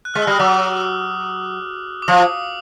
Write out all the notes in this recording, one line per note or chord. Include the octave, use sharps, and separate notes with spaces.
F#6
G#3 F6
E6
G3 D#6
F#3 D6
D6
F3 D#6